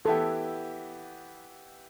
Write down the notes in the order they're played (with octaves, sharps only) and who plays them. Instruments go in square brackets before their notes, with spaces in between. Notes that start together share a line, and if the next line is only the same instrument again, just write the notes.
[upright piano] E3 B3 E4 G4 [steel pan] A4